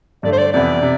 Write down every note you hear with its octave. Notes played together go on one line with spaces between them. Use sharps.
G2 D3 A3 D5
C5
D5
F2 C3 E3 B3 E4 D5
C3